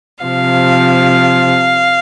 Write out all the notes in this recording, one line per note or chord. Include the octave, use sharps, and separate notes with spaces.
C3 F3 F5